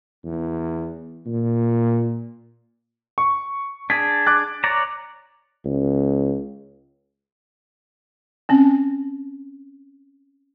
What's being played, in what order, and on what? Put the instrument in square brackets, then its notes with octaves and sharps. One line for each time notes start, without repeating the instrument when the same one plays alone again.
[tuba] E2
A#2
[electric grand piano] C#6
[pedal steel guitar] D4 G#4 [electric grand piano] B6
[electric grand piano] D6 F#6 A6
[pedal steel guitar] C#5 D5 A#5
[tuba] C#2
[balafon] C4 C#4